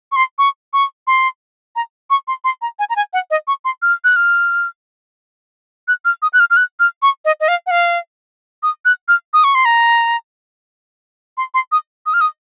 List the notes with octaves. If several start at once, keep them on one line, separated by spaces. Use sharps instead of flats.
C#6
C6
C#6
C#6
C6
A#5
C#6
C6
C6
A#5
G#5
A#5
G#5
F#5
D#5
C#6
C6
F6
F#6
F6
F#6
F6
D#6
F#6
F6
F6
F#6
F6
C#6
D#5
D#5
F5
F#5
F5
D#6
F#6
F6
D#6
C#6
C6
A#5
C6
C6
D#6
D#6
F6
D#6